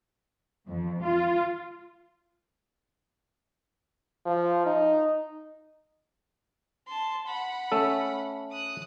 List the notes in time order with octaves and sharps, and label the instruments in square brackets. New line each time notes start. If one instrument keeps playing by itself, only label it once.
[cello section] F2
F4
[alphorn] F3
D#4
[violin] A5 C6
F#5 B5
[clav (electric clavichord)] A3 C#4 A4
[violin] D#6 F#6